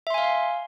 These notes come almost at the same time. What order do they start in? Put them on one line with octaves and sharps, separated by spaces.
E5 C6 G#5 F5